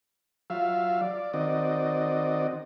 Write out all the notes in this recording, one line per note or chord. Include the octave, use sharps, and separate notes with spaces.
F#3 F4 E5 F5
D5
D#3 C4 F#4 D5 D#5